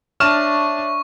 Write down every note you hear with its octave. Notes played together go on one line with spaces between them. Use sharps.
D4 C#5 E5 A5 C#6 F6 E7